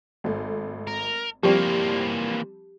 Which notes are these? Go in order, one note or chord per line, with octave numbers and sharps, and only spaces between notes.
G#1 A3
A#4
E3 F3 G3 A#3 C4 G4